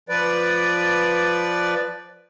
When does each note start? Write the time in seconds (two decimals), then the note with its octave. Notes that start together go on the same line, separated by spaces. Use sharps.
0.09 F3 B4 D5